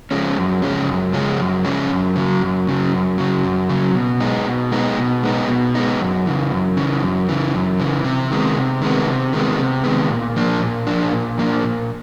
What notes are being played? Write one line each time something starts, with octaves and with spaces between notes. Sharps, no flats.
C#3 F3 G#3 C#4
F#2
C#3 F3 G#3 C#4
F#2
C#3 F3 G#3 C#4
F#2
C#3 F3 G#3 C#4
F#2
C#3 F#3
F#2
C#3 F#3
F#2
C#3 F#3
F#2
C#3 F#3
B2
G#3 B3 D#4
B2
G#3 B3 D#4
B2
G#3 B3 D#4
B2
G#3 B3 D#4
F#2
C#3 E3
F#2
C#3 E3
F#2
C#3 E3
F#2
C#3 E3
C3
D#3 G#3 B3
C3
D#3 G#3 B3
C3
D#3 G#3 B3
C3
D#3 G#3 B3
A#2
F3 A#3 D4
A#2
F3 A#3 D4
A#2
F3 A#3 D4
A#2